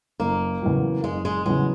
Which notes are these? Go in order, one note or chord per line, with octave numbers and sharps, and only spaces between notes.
F#1 A#3
E2 C#3 F#3
F#1 G#3
G#3
E2 C#3 F#3 G#3